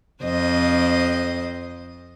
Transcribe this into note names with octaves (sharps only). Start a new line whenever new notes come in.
F2 C5 D#5